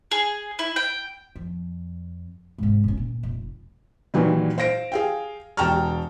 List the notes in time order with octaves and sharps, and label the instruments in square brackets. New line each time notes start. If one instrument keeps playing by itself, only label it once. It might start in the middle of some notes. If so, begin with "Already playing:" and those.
[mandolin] G#4
E4
G5
[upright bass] F2
G#2 C3
F1 C#4
A#2
F1
[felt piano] A#2 D#3 E3 F#3 G3
C5 F5 A#6 D7
G#4 F5 G5
E1 G5 A5 A#5 C#6 F6